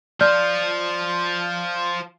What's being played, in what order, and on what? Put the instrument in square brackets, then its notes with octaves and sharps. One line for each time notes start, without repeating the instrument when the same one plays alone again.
[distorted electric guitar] F3 F4 [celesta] D5 F6 G6